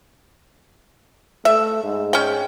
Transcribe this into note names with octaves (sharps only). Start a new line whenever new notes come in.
A3 E5
G#2
C#4 G5